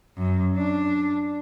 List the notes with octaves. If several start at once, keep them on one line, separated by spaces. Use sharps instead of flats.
F#2
D4